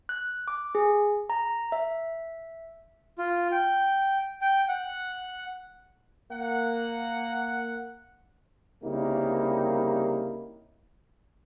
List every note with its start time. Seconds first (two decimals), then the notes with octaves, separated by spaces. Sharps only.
0.09 F#6
0.48 D6
0.75 G#4
1.30 A#5
1.72 E5
3.18 F4
3.52 G5
4.42 G5
4.68 F#5
6.32 A#3 F#5
8.84 C2 C#3 G3 A#3 D#4 E4